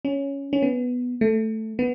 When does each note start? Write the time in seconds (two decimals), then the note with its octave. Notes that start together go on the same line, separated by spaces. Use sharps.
0.05 C#4
0.53 C#4
0.63 B3
1.21 A3
1.79 B3